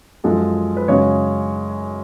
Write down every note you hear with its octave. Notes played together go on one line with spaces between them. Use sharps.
F#2 F3 G#3 A4
B4
F#2 C#3 G#3 C#5